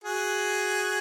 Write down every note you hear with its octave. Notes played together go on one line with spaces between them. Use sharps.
F#4 G#4